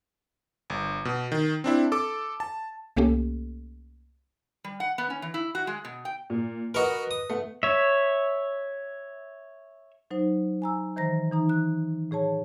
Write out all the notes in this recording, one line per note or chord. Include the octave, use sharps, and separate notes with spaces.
G1
B2
D#3
C4 D4 E4
A4 D6
A5
C2 A3 A#3 C#4 G4 A4
G3
F#5
B3
C#4
E3
E4
F#4
G#3
B2
G5
A#2
F#4 A#4 B4 D#5
D#6
A3 B3
C#5 E5
F#3 D#4 C5
G#5 A#5 E6
D#3 E3 C5 A#5 A#6
E3 D#4 A#5
F#6
A2 G#4 C#5 A5